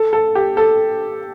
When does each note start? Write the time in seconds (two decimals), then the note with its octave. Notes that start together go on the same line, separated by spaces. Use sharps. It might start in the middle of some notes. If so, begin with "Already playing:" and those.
Already playing: A4
0.13 A4
0.35 G4
0.57 A4